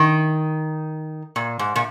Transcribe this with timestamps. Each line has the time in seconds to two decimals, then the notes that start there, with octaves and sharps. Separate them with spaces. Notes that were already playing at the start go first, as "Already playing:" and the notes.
Already playing: D#3
1.36 A#2
1.59 G#2
1.76 A#2